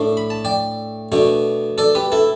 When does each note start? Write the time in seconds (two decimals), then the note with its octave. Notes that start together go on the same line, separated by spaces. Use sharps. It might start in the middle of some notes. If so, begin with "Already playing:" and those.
Already playing: A2 A3 D4
0.17 B5
0.30 A5
0.45 D5 G5
1.12 B2 A3 D4
1.78 A4 D5
1.95 G4 B4
2.12 E4 A4